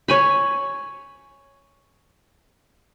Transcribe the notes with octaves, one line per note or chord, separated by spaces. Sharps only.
C#5 G#5 B5